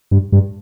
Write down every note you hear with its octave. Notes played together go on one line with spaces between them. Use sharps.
G2
G2